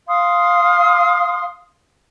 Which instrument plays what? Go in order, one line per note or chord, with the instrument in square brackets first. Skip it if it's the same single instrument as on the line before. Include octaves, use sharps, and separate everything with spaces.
[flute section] F5 C6 D#6